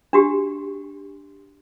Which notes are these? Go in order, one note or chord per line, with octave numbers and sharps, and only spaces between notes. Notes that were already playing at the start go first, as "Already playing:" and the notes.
D4 F#4 G4